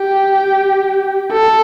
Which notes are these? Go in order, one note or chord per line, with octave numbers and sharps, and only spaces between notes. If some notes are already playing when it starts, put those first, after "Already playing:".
Already playing: G4
A4